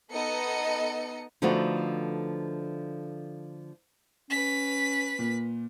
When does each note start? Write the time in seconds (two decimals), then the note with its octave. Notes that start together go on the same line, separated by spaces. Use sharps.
0.11 B3 D#4 A4 D#5 C#7
1.42 D3 F3 A3 B3 D#4 F#4
4.30 C#4 B4 B6
5.19 A#2